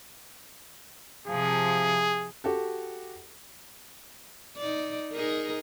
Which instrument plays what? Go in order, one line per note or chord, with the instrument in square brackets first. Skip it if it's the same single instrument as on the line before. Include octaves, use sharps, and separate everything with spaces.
[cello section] C3 F3 [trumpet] G#4
[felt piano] F#4 G4 A4
[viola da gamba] D#4 D5
D#4 G#4 A#4